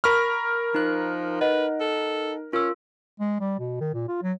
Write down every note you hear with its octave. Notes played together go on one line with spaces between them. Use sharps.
A#4 B5 C#6 F6 B6
F3 D#4 F#6
B4 D#5 F#5
A4
C#4 F4 A#4 E6
G#3
G3
B2
D#3
A#2
F4
F#3